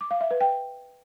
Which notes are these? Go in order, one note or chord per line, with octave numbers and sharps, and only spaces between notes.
D6
F5
E5
B4
G5